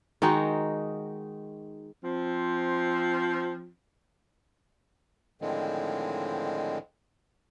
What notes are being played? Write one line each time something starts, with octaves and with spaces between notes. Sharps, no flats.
D#3 G#3 D#4 F#4
F3 C4
A2 D3 D#3 F3 G#3 C4